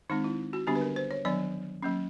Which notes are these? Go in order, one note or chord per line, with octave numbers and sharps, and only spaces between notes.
D#3 G#3 C4 D#4
E4
F#4
D3 G3 B3 D4 G4
B4
A#4
C5
C#5
D#3 F#3 B3 D4 D5
F#3 A#3 C#4